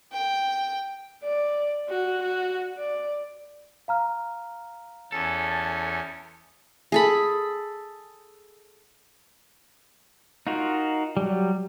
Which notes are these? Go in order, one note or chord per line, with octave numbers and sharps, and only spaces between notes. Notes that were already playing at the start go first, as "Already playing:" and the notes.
G5
D5
F#4
F#4
D5
F5 A#5 F6
E2 C#4 A4
G#4 A4 B5
D#4 F4 F#4 A#4
F#3 G3